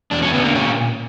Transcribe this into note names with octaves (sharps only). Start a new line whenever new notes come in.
E2 D4
C#4
D3 B3
A#3
A#2 C#4